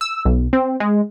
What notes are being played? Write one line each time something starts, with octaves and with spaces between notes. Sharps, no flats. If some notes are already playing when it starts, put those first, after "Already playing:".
E6
B1
C4
G#3